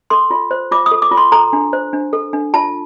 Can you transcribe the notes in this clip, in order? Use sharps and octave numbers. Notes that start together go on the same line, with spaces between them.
A4 C6
F4
C5
F4 D6
D#6
A4
D6
F4
C6
A4 A#5
D4
C5
D4
A4
D4
F4 A5